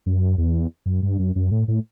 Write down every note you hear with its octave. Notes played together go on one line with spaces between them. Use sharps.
F#2
E2
F#2
G2
F#2
F#2
A2
A2